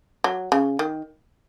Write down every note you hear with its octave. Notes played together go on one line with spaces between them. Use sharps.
F#3
C#3
D#3